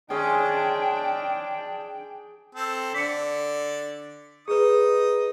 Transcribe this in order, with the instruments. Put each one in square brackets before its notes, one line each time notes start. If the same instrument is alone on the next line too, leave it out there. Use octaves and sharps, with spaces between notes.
[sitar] D#3 G#3 C#4 [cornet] D4 [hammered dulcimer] G#4 [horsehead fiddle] G5
[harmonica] C4 A4
[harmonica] D3 D5 [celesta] B6 C#7
[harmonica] D#4 D#6 [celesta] G#4 B4